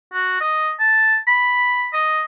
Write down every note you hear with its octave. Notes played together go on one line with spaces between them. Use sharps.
F#4
D#5
A5
B5
D#5